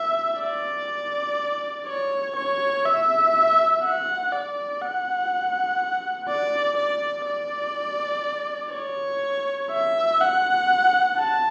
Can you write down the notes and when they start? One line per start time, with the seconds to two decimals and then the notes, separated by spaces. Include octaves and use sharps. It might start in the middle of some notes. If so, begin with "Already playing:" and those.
Already playing: E5
0.40 D5
1.87 C#5
2.36 C#5
2.85 E5
3.84 F#5
4.32 D5
4.82 F#5
6.28 D5
6.77 D5
7.26 D5
8.73 C#5
9.71 E5
10.21 F#5
11.18 A5